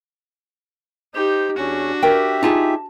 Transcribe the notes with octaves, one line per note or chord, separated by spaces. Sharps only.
D#4 G4 C5
E2 C#4 D4 F#4
G4 A#4 E5 G5
D#4 F4 G#4 A5